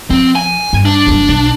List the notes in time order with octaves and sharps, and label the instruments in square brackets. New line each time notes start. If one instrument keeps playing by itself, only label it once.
[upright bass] F3 [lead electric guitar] C4
[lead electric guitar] G#5
[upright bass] G2
[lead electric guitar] D4
[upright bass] F1 F#2
B1